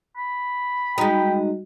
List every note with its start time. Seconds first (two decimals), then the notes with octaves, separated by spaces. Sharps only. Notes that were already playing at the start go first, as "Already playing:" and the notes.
0.17 B5
0.98 G3 G#3 D#4 F#4 D#5 G5